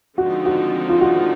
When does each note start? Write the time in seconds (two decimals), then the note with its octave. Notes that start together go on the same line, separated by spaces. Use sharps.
0.17 D3 F3 G#3 C4 D#4 F#4
0.46 F#4
0.89 F4
1.01 F#4